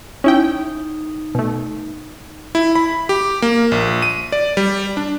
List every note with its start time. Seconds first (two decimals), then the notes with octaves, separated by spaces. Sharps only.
0.24 C#4 D#4 E4 G5
1.35 B2 A3
2.55 E4
2.75 B5
3.09 G4
3.42 A#3
3.72 A#1
4.02 D#7
4.32 D5
4.57 G3
4.97 D4